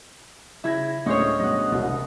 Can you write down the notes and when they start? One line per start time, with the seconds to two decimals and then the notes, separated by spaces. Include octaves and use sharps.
0.64 C#3 E4 G#6 A#6
1.06 D2 A2 G#3 C#4 C5 C#5 D#5
1.40 G2 B2 G#3 D#5 F#5
1.72 E1 C2